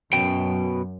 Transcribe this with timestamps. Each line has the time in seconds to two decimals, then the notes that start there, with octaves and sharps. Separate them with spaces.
0.13 F#2 B2 G5